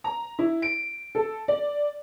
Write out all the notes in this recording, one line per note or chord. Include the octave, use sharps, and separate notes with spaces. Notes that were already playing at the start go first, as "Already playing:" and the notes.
A#5
E4
D7
A4
D5